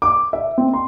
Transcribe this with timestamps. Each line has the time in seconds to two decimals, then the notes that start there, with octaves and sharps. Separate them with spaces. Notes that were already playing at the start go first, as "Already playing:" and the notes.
0.02 D6
0.33 E5
0.58 C4
0.73 C6